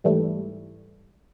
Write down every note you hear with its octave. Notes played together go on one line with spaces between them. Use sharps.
G#2 E3 G3 A3